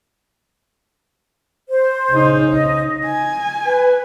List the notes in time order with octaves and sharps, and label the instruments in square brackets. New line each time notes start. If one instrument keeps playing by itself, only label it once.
[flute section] C5
[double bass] C#3 D#4
[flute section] D#5
[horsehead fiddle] G#5
[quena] B4